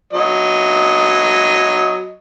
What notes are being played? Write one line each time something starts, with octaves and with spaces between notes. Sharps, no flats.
F#3 D#5